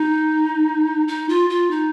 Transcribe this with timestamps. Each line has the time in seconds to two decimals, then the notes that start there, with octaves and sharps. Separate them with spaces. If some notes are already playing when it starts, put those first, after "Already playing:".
Already playing: D#4
1.08 D#4
1.29 F4
1.50 F4
1.71 D#4